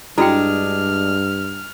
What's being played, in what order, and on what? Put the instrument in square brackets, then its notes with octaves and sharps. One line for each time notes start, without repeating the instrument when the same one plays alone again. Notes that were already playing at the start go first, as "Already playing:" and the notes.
[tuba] G2 [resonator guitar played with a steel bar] G#3 D4 [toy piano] E4 F#4 G5 [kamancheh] F6